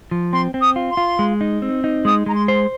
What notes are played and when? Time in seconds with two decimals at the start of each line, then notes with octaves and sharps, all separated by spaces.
0.11 F3
0.33 C4 C6
0.54 C4
0.61 D#6
0.76 F4
0.90 C6
0.97 F4
1.19 G#3
1.41 D#4
1.62 C4
1.84 D#4
2.05 G#3 D#6
2.26 G#3 A#5
2.34 C6
2.48 C5